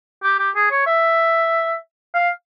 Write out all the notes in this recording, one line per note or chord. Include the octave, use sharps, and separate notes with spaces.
G4
G4
G#4
C#5
E5
F5